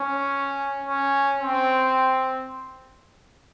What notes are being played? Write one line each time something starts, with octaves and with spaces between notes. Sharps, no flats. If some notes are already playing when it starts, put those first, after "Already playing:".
Already playing: C#4
C#4
C4